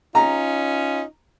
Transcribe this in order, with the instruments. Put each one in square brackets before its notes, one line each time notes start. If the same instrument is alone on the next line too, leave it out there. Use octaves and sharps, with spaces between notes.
[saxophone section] C#4 D#4 F4 [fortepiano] A#5